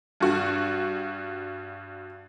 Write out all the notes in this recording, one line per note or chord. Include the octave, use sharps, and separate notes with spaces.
G2 F#4